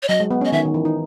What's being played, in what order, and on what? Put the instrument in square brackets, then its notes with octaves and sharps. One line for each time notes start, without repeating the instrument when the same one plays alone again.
[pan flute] C#5
[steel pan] F#3 [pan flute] D#5
[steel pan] G#3
B3
C#4
[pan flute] D#5
[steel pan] D#3 [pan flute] E5
[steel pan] D#3
E3
D#4